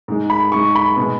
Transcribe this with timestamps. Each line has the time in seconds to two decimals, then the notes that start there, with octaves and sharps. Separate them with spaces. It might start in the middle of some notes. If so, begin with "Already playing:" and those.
0.08 G#2 G#3
0.30 B5
0.52 G#2 G#3 C#6
0.75 B5
0.96 B2
1.01 G#3